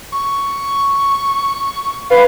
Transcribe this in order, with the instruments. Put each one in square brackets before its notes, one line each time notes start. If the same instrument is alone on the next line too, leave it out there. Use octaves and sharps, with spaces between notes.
[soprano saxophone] C#6
[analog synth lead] B4 [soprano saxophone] F5